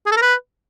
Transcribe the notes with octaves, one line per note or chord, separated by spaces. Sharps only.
G#4
A4
A#4
B4